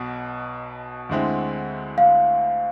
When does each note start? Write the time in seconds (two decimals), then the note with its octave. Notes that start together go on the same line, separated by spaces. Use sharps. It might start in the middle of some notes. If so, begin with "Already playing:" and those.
Already playing: B1 B2
1.09 D2 D3 G#3 C4 E4
1.98 F5